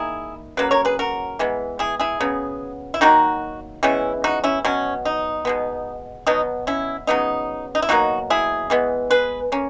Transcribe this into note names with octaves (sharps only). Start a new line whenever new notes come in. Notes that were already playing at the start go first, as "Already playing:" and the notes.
Already playing: D#3 A#3 E4 G#4
C#3 F#3 A#3 B4
A#4 C#5
G#4 B4
F#4 A#4
E3 G#3 B3
E4 G#4
E4 G#4
C#3 F#3 B3
E4
D#3 F#3 A#3 D#4 F#4
C#3 E3 G#3 B3 C#4 E4
D#4 F#4
C#4 E4
B2 F#3 B3 C#4
D#4
B2 G#3 B3
B2 F#3 B3 D#4
C#4 E4
C#3 F#3 B3 D#4
D#4
E4
B2 F#3 A#3 D#4 F#4
E4 G#4
E3 G#3 B3
G#4 B4
A#3 C#4